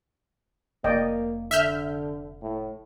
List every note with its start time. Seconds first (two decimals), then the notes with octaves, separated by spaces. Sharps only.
0.84 F1 A#3 D5 D#5 G5
1.51 D3 E5 F6 G6
2.42 A2